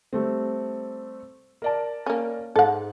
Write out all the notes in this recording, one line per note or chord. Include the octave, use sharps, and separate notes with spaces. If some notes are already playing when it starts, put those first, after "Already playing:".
G3 A3 C4
A#4 D5 A5
A#3 C#4
G#2 A4 F#5